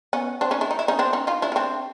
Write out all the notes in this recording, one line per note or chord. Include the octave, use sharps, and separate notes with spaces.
B3 C#4
C4 D4
C#4 D#4
D4 E4
D#4
E4
C#4 D#4
C4 D4
C#4 D#4
D#4 F4
D4 E4
C#4
C4 D4